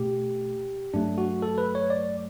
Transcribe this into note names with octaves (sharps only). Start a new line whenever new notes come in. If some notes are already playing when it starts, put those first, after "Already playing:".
Already playing: B2 A3 G4
G2 F#3 A3 D4
F#4
A4
B4
C#5
D5